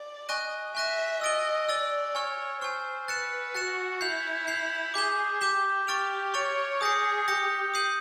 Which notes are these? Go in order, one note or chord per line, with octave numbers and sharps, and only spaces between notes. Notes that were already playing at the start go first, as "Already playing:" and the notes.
Already playing: D5
D#5 G#5 C#6 F#6 A#6 D#7
E5 G#5 C#6 F#6 A#6 D#7
D#5 E6 A6 D7 G7
D5 E6 A6 D7 G7
C#5 G#5 C#6 F6
C5 G#5 C#6 F6
B4 F#6 A6 C#7 E7
F#4 F#6 A6 C#7 E7
E4 G6 C7 F7
G6 C7 F7
G#4 D6 G6 B6 E7 G7
G4 D6 G6 B6 E7 G7
G4 C#6 F6 A6 D7 F7
C#5 C#6 F6 A6 D7 F7
G#4 D#6 G6 A#6 C#7
G4 D#6 G6 A#6 C#7
D#6 G6 C7 D#7 F#7